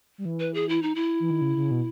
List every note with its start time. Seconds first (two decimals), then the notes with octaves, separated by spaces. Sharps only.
0.18 G3
0.25 E3
0.40 B4
0.54 G#4
0.69 E4
0.83 D#4
0.95 E4
1.20 E3
1.30 D#3
1.41 C#3
1.56 C#3
1.71 B2